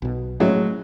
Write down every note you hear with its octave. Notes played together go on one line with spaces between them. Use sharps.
B1 B2
A2 F#3 G#3 A3